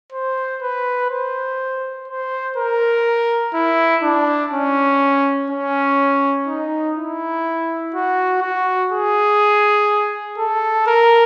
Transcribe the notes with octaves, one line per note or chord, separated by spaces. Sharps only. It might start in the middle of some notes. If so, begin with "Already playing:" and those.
C5
B4
C5
C5
A#4
E4
D4
C#4
C#4
D#4
E4
F#4
F#4
G#4
A4
A#4